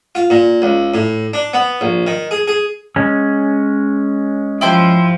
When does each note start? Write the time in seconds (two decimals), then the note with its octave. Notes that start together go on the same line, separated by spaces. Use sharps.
0.15 F4
0.30 A#2
0.62 C#2
0.94 A2
1.33 D4
1.53 B3
1.81 A#1
2.07 D#3
2.31 G#4
2.48 G#4
2.96 G#3 C#4
4.61 F3 E4 G4 C5